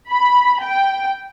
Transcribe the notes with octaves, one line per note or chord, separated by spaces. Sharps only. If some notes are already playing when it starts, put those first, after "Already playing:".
B5
G5